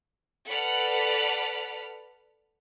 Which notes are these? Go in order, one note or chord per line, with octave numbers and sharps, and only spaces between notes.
A4 B4 D5 F#5 B5 F6